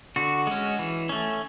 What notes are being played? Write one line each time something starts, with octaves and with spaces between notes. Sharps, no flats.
D3 F#4
G#3 C#4
E3
A3 C#4